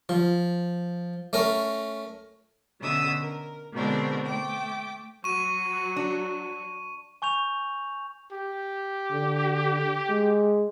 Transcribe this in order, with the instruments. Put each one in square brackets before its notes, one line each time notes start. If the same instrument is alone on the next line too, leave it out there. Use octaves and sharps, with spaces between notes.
[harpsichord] F3 [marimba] F4
[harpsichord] A3 C#4 A#4
[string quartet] B2 D3 C#4 E5 D#6 E6
A#4
B2 D3 G#3 C4 D4 A#4
A3 G5 D6
[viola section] F#3 F#4 [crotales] C#6 D#7
[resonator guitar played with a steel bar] D4
[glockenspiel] G#5 C#6 G6 F7
[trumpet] G4
[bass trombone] D3
G#3